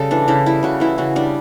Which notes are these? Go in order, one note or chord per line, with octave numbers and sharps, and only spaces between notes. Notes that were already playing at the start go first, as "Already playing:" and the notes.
Already playing: C#3 G3 A4
E3 D4
C#3 E4
G3 E4
C#3 F#4
E3 E4
C#3 F#4
G3 D4